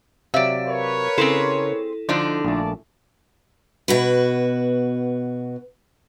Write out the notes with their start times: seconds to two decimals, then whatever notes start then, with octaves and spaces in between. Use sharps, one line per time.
0.34 C3 F#3 D5 E5 F5
0.66 A#4 B4 C#5
1.18 C#3 C4 E4 G#4 A4 C5
2.09 D3 F3 D4 D#4 C5 D5
2.45 A#1 A#2 A3 D5 A5
3.88 B2 F#4 B4